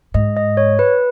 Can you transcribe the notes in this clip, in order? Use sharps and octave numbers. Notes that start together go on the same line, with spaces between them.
G#2 D#5
D#5
C#5
B4